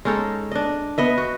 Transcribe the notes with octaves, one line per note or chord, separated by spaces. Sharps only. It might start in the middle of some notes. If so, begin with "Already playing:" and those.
G#3 C#4 D#4 A4
D4 D#5
B3 D#5 E5
F#4